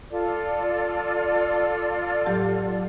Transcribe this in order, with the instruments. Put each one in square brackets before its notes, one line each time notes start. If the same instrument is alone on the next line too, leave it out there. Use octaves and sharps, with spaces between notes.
[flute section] F4 A4 D5
[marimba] A2 F#3 G4